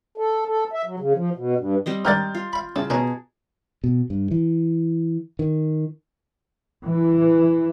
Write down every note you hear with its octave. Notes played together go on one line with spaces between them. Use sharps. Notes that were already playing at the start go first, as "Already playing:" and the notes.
A4
A4
E5
F#3
C#3
F3
B2
G2
G3 C4 D#5
G#2 D#3 D4 G5 A#5 F6 G6 A6
F4
F5 B5
A2 C#3 A5
B2 C#4 D#4 G#4 A#4 G#5 A#5
B2
G2
E3
D#3
E3